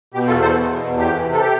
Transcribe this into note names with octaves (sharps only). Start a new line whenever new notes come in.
B2 G4
E2 F4 A4
B2 A4 C5
E2
B2
E2
F2 G4
E3
C3
A4
G4